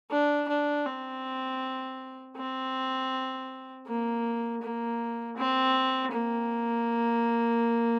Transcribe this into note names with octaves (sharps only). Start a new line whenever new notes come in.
D4
D4
C4
C4
A#3
A#3
C4
A#3